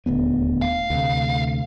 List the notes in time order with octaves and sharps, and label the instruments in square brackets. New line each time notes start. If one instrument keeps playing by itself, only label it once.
[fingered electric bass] D#1 D2 B3
[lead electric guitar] F5
[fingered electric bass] D2 C3